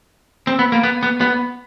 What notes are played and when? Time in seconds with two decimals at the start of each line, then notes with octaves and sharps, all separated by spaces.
0.47 C4
0.59 B3
0.72 A#3
0.83 B3
1.03 B3
1.21 B3